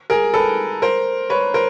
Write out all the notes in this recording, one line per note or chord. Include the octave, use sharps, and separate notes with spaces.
G#4 A#4
A4 B4
A#4 C5
B4 C#5
A#4 C5